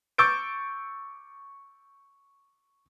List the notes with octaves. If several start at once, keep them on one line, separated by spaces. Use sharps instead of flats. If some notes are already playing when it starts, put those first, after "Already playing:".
C#6 D6 E6 G6 A6 D7